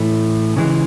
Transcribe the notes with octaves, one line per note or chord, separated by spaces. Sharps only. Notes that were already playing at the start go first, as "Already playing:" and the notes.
Already playing: A2 E3 A3
C#3 E3 G#3